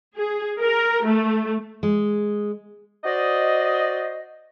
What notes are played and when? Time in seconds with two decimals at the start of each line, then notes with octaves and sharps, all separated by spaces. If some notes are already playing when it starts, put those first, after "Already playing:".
0.17 G#4
0.61 A#4
1.05 A3
1.83 G#3
3.04 F#4 C5 D5 D#5